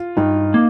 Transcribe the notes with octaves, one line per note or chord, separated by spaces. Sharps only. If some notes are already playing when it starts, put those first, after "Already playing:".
Already playing: F4
G2 D#4
A#3